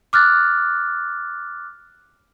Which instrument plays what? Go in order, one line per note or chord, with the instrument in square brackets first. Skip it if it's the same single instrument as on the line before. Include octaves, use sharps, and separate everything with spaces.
[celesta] D6 F6 F#6 A6